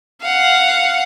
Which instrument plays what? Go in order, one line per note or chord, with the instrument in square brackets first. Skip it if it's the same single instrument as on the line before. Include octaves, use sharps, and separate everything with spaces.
[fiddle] F5 F#5